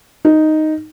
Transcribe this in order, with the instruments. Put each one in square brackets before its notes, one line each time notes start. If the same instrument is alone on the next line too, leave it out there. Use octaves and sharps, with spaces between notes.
[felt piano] D#4